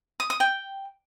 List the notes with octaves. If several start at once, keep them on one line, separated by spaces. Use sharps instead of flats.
D#6
D#6
G5